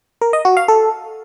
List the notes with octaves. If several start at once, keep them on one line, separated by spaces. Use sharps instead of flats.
A#4
D#5
F#4
F5
A4